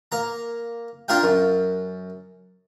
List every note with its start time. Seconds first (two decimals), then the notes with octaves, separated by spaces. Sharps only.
0.12 A#3 A#5
1.08 D4 F4 A#4 F5 G5
1.23 F#2